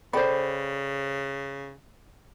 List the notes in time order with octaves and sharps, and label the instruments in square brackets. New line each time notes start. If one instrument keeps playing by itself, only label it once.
[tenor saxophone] C#3 [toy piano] A4 G5 B5 [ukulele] C5 D5